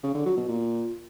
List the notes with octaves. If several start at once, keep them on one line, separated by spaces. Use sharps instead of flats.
C#3
D3
F#3
B2
A#2